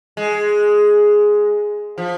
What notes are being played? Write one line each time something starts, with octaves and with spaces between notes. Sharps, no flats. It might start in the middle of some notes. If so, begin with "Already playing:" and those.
G#3
F3